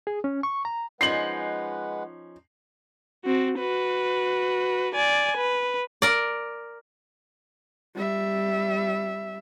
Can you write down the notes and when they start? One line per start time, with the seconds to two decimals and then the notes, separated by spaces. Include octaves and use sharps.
0.07 G#4
0.24 C#4
0.43 C#6
0.65 A#5
1.01 F3 G#3 C#4 D#4 B4 F#5 C7 F#7
3.25 C4 F#4
3.59 F#4 B4
4.95 D5 G#5
5.37 B4
6.02 A#4 D5
7.95 G3 E5